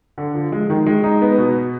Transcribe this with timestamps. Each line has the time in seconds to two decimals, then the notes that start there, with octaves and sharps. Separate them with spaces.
0.18 D3
0.35 F3
0.52 G#3
0.70 D#3
0.86 G#3
1.04 D#4
1.22 B3
1.38 B2